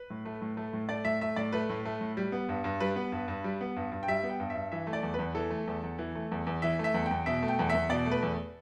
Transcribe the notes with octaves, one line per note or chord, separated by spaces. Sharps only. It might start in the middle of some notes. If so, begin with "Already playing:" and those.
Already playing: B4
A2
A3
A2
A3
A2
A3 D5
A2 E5
A3 E5
A2 D5
A3 B4
A2
A3
A2
G3
B3
G2
G2
G3 B4
B3
G2
G2
G3
B3
G2
G2
G5
G3 E5
B3
G5
G2
E5
G2
E3 E5
A3
D5
E2
E2 B4
E3 A4
A3
E2
E2
E3
A3
E2
E2
E3 E5
A3 E5
E2
G5
E2
B2 E5
A3
G5
E2
E5
E2
B2 D5
A3
B4
E2